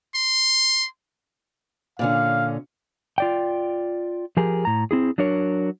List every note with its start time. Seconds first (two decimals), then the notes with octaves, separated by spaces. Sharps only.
0.15 C6
1.99 A#2 D3 C#4 F5
3.18 F4 D5 G5
4.37 F3 G4 G#4 A#4
4.65 A2 A#5
4.91 C4 E4 G#4
5.18 F#3 D4 A#4 C#5